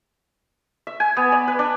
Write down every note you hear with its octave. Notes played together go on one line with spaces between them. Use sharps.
E5
G#5
B3
D5
B4
D4